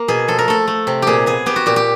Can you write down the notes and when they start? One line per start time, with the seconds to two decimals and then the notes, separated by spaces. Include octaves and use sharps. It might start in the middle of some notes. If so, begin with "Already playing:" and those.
Already playing: A#3
0.08 B2 G#4
0.28 F3 A4
0.39 A#4
0.48 A3 A4
0.68 A3
0.87 C3
1.02 A#2 G4 G#4
1.26 B3 G#4
1.46 B3 G4
1.56 F#4
1.66 A#2 G4
1.76 G4